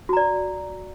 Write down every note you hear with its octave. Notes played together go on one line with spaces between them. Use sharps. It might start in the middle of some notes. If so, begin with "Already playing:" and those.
F#4 D5 A#5